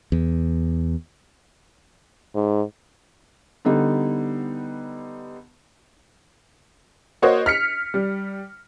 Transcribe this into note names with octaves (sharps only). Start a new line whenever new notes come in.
E2
G#2
D3 G3 B3 D#4
A#3 F#4 C5 C#5 D#5
F6 B6 C#7
G3